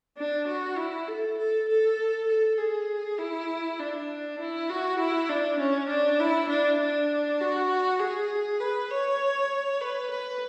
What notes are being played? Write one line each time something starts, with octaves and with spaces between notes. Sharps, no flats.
D4
F#4
E4
A4
A4
A4
A4
G#4
E4
D4
E4
F#4
E4
D4
C#4
D4
E4
D4
D4
F#4
G#4
B4
C#5
B4
B4